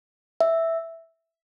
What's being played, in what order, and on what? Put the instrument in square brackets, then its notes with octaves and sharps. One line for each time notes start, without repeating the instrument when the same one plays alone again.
[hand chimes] E5